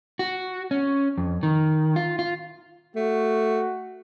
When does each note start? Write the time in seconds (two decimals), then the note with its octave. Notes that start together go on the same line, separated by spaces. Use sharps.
0.19 F#4
0.71 C#4
1.18 F2
1.43 D#3
1.96 F4
2.19 F4
2.96 A3 F#4